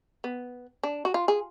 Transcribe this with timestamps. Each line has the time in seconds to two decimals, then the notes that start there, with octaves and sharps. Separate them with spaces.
0.24 B3
0.83 D4
1.05 F#4
1.14 F4
1.28 G#4